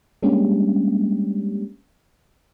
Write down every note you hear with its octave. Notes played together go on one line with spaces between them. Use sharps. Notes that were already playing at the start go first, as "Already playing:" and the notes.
G3 G#3 A#3 C#4 D4 G4